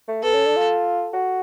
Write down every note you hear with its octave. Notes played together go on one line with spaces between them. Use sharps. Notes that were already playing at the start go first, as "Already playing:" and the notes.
A3
B3 A4
C#4
D4
F4
F#4